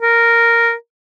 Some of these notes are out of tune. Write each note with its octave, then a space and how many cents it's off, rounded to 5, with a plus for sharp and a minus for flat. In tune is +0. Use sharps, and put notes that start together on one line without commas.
A#4 -5